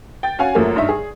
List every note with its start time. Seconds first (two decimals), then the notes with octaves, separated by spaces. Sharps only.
0.23 G5 A6
0.39 C#4 F#4 F5 G#5
0.55 F#2 F3 A3 A#3
0.76 G2 D#4 E5
0.89 G#4